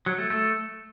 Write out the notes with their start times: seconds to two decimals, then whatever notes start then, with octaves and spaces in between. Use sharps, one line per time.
0.06 F#3
0.18 A3
0.30 A3